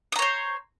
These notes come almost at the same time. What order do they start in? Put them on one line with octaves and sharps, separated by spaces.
D#6 A#5 C#5 C5